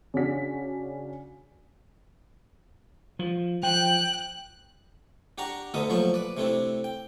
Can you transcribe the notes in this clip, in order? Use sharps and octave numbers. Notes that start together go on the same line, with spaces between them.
C#3 D4 F#4 B6
F3
F3 G5 F#6
D4 G4 F#5 A#5 C#6
D2 B2 D3 D#4 E5 D#6
A#2 F3 F#3 A3 C5 C#6
B4 D5
C3 A3 C4 D4 E4
G5